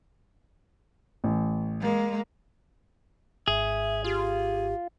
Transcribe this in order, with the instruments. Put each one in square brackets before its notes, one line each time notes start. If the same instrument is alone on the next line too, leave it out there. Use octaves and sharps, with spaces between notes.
[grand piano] A1
[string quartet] G#3 A#3
[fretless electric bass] G#1 [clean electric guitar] G#4 [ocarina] E5
[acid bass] F4 [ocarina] G4